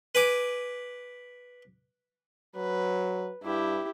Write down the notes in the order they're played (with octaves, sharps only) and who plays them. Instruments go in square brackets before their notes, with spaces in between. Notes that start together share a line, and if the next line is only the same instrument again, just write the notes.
[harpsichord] B4 G#5 D6
[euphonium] F#3 [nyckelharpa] B4
[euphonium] G2 [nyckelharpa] E4 G4